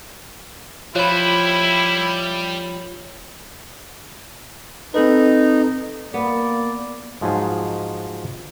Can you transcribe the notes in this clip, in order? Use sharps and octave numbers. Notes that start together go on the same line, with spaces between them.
F3 G3 E4 F4 C#5 B5
C4 D#4 A4 B4
A#3 B3 D5
G#2 F3 F#3 D#4 G#4